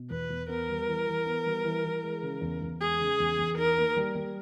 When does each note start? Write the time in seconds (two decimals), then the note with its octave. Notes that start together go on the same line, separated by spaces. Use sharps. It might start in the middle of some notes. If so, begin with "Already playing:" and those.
Already playing: B2
0.10 E2 B4
0.30 E2
0.48 B3 A#4
0.69 G3
0.88 E3
1.07 E3
1.26 B3
1.46 G3
1.64 E3
1.84 E3
2.03 G#3
2.22 C#3
2.41 E2
2.62 E2
2.81 G#3 G#4
3.00 C#3
3.20 E2
3.39 E2
3.58 D#4 A#4
3.77 A#3
3.97 G3
4.15 G3